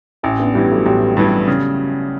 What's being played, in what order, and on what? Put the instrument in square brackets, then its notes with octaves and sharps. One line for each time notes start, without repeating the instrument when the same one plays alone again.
[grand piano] A1 [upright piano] C#4 E4
[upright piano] B3 D4
[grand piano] G2 E3 [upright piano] G3 B3
[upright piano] F#3 A3
[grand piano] A1 [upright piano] G3 B3
[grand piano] G2 E3
C#3